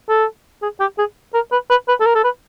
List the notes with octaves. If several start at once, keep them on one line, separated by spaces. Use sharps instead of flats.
A4
G#4
G4
G#4
A#4
B4
B4
B4
A4
A#4
A4
B4